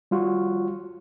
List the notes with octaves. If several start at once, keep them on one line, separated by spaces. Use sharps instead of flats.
G3 F4 F#4